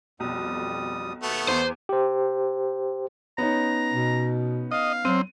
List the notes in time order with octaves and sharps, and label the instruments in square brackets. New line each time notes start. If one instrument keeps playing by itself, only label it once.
[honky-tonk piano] B1 [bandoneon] F2 G3 D#6
[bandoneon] D#2 [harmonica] A3 B3
[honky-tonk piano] E2 D#7 [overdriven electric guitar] C5
[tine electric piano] G4 C5
[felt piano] B3 C#4 D#4 [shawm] A#5
[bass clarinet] B2
[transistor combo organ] D#5 [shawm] F5
[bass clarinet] F#3 [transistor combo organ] C4 [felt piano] D#7